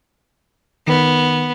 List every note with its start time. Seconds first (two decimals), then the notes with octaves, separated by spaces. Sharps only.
0.87 D#3 B3